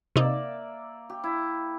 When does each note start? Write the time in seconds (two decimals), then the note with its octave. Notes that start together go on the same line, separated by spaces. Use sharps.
0.16 C3 A#3 D#4 D5 E5
1.10 G4
1.24 E4